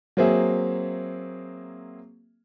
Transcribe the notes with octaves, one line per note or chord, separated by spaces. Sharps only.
F#3 A#3 C4 G#4 E5